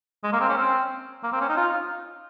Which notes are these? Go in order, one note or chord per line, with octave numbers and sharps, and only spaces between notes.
G#3
A#3
C4
C#4
C4
A#3
C4
C#4
D#4
F4